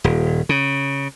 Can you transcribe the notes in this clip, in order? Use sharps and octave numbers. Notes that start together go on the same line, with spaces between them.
D#1
C#3